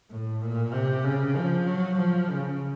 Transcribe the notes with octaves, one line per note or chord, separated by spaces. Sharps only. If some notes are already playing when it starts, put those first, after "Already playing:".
A2
A#2
C3
C#3
F3
F#3
F3
C#3